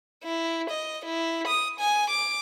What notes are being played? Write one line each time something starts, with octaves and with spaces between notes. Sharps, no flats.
E4
D#5
E4
D#6
G#5
D6